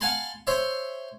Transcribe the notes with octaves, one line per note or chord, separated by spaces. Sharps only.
F5 F#5 G#5 A5 B5 C6
C5 C#5 E5 C6